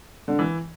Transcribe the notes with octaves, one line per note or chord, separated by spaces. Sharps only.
D3
E3